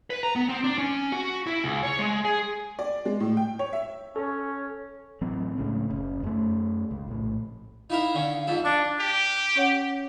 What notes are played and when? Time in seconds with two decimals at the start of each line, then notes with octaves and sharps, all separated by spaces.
0.10 B4
0.23 A#5
0.36 B3
0.49 C4
0.64 D4
0.78 C#4
1.12 F#4
1.47 E4
1.64 C#2
1.83 C#5
1.99 G#3
2.25 G#4
2.79 D5
3.05 G#3
3.20 A2
3.37 G5
3.59 C#5
3.73 E5
4.16 C#4 A4
5.21 A1 F#3 C4
5.58 C#2 A2 C#3
5.89 F#1 C#3
6.23 F#2 A3
6.91 C#2
7.08 A#1 A2
7.90 D#4 E4 A#4 F5
8.15 D3 C#4
8.47 F2 G#2 A4
8.65 D4 C#6
9.00 G4
9.56 C#4 C#5 F#5